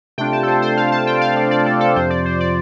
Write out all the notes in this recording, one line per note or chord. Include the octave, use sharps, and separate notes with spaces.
C3 A3 D4 F4 G5
A5
A4
C5
C5
F5
A5
G5
F5
D5
D5
A4
A4
F2 C3 F3 C5
D5
C5
D5